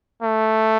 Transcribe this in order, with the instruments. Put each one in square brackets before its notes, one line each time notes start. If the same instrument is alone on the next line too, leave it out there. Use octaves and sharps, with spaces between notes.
[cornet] A3